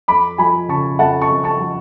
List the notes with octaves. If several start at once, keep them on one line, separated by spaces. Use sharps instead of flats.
F2 B5 D6
F3 G#5 B5
C#3 A5 C#6
F2 F#5 A5
A5 C#6
F2
A5 C#6
F3